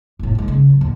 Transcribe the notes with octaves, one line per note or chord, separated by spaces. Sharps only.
F1 A2
D#2 G#3
C#3
F#3
D1 F2